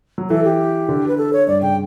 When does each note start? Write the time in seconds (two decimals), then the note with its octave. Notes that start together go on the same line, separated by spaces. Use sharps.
0.18 F#3
0.30 E3 A4
0.44 G4
0.89 D3
1.08 B4
1.18 A4
1.33 C#5
1.47 G2 D5
1.62 C#3 G5